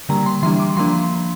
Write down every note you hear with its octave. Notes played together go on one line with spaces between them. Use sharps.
D3 G3 A#3 A#5
C6
E3 G3 D4 C6
D6
F3 A#3 D4 C6